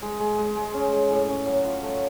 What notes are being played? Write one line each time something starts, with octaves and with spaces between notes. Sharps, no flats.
G#3
G#3
G#3
G#3
C#4
G#3
A2
C#4
F#3
F4
A3